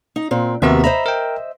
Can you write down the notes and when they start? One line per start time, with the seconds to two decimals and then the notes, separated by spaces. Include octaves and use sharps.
0.16 D#4
0.31 A#2 C4
0.62 D#2 C3 B3 F#4 A#4 E5
0.84 C5 D#5 E5 A#5 B5
1.06 A#4 G5